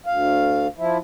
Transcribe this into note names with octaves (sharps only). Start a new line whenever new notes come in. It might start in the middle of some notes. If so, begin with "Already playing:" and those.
D2 F5
F3 E4